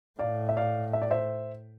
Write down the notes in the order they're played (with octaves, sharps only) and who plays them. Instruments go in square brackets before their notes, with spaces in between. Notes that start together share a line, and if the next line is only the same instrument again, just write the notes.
[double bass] A2 [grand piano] D5 F5
[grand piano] E5
D5 F5
E5
D5
C5 E5